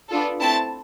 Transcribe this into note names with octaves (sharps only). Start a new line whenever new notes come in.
B3 D4 F4 A4
A3 C4 E4 A5